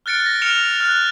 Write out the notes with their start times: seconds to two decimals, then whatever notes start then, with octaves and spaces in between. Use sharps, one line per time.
0.06 F6 F#6 A6 C#7 D7
0.26 A#6
0.42 F6 C#7 D7 E7 F7
0.80 F6 F#6